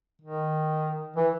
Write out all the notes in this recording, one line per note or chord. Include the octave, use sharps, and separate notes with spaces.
D#3
E3